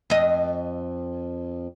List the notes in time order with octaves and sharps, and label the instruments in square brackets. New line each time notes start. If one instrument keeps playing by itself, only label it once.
[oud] F2 D#5